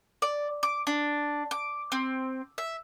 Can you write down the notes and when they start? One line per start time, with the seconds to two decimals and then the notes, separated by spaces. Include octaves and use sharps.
0.22 D5
0.63 D6
0.87 D4
1.51 D6
1.92 C4
2.58 E5